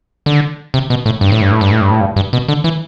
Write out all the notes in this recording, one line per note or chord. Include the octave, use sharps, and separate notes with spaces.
D3
C3
B2
A2
G2
A2
G2
A2
G2
A2
G2
A2
G2
G2
B2
D3
E3